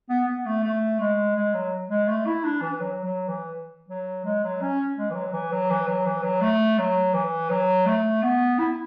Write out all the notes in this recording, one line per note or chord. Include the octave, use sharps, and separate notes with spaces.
B3
B3
A3
A3
G#3
G#3
F#3
G#3
A3
E4
D4
E3
F#3
F#3
E3
F#3
G#3
F#3
C#4
G#3
E3
F#3
E3
F#3
E3
F#3
E3
F#3
A3
F#3
E3
F#3
A3
B3
E4